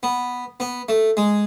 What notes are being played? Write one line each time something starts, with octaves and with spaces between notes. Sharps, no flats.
B3
B3
A3
G#3